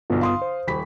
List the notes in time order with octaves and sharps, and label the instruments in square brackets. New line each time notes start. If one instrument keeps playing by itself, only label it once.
[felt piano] B1 D3 [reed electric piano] G2 B3 F4
[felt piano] F5 C6 D#6
[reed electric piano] C5
[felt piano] D#1 B5 B6